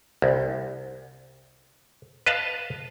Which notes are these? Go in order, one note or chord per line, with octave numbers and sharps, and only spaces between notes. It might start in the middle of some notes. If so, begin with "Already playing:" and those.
C2
B4 D#5 F5 A5